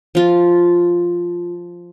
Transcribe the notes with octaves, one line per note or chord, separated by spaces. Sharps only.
F3 F4